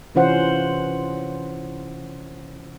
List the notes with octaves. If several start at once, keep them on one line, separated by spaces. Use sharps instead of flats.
C3 E3 C#4 F4 C5 F#5